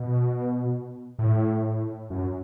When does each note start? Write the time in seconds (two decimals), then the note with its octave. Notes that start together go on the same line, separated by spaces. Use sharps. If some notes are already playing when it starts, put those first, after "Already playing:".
Already playing: B2
1.19 A2
2.10 F#2